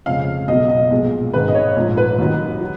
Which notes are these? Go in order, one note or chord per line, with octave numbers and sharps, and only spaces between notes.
F2 C#3 G#3 F5
B1 B2 F#3 D#5
D#5
B1 A#2 F3 G#3
G#1 G#2 D#3 G#3 B4
D#5
C#5
A#1 G#2 F3
B4
D#2 D#3 F#3
F#3